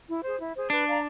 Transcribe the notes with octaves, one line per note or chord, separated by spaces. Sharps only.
E4
G#4 C5
E4
G#4 C5
D4 B4
D5 F5 A#5